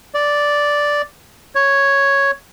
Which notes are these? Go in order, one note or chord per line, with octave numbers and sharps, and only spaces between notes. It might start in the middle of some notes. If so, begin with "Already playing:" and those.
D5
C#5